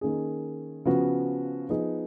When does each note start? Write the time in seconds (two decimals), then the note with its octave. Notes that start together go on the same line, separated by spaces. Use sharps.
0.01 D#3 A#3 C#4 G#4
0.85 C#3 F3 B3 F#4
1.69 F3 B3 D#4 G#4